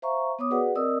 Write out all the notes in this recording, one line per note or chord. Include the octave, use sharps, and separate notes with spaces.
C5 E5 F5 A#5 C#6
B3 C#5 D6 D#6
F#4 G#4 B4 D5 F#5
C4 A#4 D5 D#5 D#6 E6